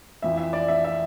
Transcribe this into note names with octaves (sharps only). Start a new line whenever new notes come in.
F2 E3 E5
E5
D5
E5
E5